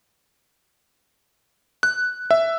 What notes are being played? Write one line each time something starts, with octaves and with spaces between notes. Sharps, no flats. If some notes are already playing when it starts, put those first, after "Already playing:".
F#6
E5